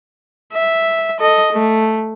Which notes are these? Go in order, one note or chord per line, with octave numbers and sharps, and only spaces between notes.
E5
A4 D#5
A3